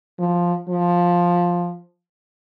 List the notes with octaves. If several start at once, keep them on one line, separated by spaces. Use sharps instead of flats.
F3
F3